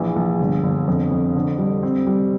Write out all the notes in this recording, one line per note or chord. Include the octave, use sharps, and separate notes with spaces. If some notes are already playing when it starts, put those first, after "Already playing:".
Already playing: A#1 E3
A#1
G1
G1
F2
F2
D3
G3
C4
G3